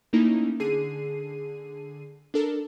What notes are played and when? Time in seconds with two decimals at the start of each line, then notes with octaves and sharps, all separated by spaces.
0.13 A3 A#3 C#4 D#4 E4
0.60 D3 G#4 C7 D#7
2.34 D4 A4 A#4